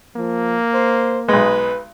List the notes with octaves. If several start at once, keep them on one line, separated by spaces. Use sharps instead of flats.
F3 A#3
C5
B1 G#3 B4